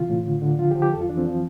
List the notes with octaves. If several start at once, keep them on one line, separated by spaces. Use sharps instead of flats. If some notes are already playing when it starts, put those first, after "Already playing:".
Already playing: C3 E3 F4
A2
D3
D3
F3 F4
G4
F3
G4
F2 A4
F4
E3 D4
C4
F3